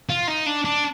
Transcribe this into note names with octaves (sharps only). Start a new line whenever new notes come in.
F4
D#4
D4
D4